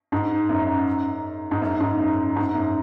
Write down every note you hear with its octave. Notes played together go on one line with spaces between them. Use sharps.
G#2
F#2
G#2
F#2
G#2
F#2
G#2
F#2